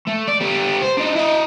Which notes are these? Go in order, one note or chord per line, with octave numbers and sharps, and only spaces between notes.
A3
D5
G3 B3
C5
D4 D#4
E4 D#5